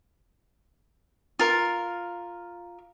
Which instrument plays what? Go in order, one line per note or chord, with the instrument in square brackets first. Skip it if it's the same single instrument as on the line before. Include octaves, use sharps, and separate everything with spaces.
[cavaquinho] F4 A#4